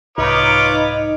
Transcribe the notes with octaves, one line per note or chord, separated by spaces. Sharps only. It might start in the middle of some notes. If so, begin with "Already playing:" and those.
C2 G#2 D#4 F4 B4 C#5 D6